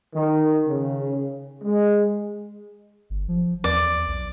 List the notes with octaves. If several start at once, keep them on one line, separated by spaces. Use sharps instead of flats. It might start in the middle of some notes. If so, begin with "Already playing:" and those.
D#3
C#3
G#3
G1
F3
E2 D5
B1